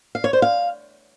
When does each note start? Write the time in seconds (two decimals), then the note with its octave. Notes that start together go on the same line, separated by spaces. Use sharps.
0.15 F5
0.24 C#5
0.33 C5
0.42 F5